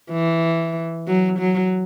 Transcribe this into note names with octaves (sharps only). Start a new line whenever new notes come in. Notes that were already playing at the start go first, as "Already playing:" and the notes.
E3
F#3
F#3